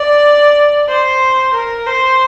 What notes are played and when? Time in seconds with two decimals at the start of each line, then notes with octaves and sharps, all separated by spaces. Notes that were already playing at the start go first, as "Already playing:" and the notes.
Already playing: D5
0.89 C5
1.53 A#4
1.86 C5